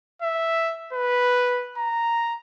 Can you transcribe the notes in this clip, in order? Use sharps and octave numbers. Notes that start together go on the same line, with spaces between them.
E5
B4
A#5